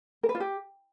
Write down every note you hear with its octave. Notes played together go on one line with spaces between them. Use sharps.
A#4
B4
F4
G4